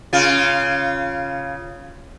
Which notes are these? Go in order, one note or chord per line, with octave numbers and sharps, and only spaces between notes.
C#3 F4